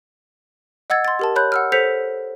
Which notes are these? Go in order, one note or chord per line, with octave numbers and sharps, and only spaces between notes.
D#5 F#5 E6 G#6 A6
C6 A6
G4 A#4 A5
C#5 B5 F#6 G6
F#5 E6 F6
A4 C5 G6 B6 C#7 F7